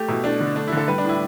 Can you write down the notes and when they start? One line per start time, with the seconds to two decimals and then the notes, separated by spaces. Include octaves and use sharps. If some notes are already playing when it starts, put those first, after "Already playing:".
Already playing: A3 G4
0.08 B2 E4
0.24 A3 D4
0.40 D3
0.56 A3 D4
0.68 D3 E4
0.77 A4
0.88 G3 B4
0.98 D4
1.05 A2 E4